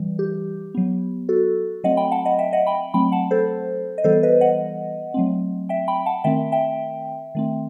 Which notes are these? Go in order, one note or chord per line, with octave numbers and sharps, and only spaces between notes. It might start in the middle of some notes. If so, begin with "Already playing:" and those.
Already playing: E3 G3
G4
F#3 B3
F#4 A4
F#3 A3 C4 D#5 F#5
G5 B5
F#5 A5
D#5 F#5
E5 G5
D#5 F#5
G5 B5
F#3 A3 C4 G5 B5
F#5 A5
A4 C5
D#5
E3 G3 B3 A4 C5
B4 D#5
D#5 F#5
F#3 A3 C4
E5 G5
G5 B5
F#5 A5
D#3 A3 C4 E5 G5
E5 G5
D#3 A3 C4